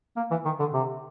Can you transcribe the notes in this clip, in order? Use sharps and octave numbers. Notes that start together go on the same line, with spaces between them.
A#3
E3
D#3
D3
C3